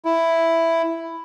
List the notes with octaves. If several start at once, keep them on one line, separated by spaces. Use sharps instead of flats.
E4